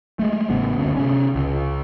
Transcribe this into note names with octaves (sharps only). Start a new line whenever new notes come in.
G#3 A3
A1 C#3 B3
F#1 D2 C#3
C3 C#4
C#2